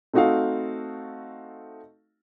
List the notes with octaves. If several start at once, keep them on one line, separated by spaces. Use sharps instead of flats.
A3 C4 D#4 F#4 A4 F5